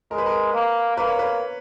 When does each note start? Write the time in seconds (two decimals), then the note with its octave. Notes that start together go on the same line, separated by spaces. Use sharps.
0.11 G#3 A#4
0.18 B4
0.26 A#4
0.54 A#3
0.97 A#3 B4
1.08 C#5
1.19 B4